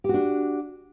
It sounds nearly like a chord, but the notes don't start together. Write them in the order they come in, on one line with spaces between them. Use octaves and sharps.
G4 F#4 D4